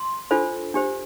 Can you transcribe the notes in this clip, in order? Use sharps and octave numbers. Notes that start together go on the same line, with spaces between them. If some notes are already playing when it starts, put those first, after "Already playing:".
Already playing: C6
D4 F4 A4 C5
D4 G4 C5